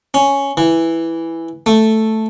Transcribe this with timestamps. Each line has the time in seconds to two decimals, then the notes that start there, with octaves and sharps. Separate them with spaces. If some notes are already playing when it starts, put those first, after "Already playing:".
0.14 C#4
0.57 E3
1.66 A3